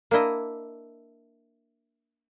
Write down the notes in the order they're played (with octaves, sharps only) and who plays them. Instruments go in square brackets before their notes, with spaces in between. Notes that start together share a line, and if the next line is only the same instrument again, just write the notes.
[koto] A#3 D4 E4 D#5